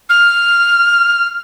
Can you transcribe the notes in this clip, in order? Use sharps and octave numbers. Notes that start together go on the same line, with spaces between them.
F6